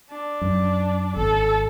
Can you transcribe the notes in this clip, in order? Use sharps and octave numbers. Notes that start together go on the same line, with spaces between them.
D4
F#2
G#1 A4